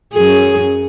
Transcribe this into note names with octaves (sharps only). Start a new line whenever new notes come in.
F#2 F#3 G#4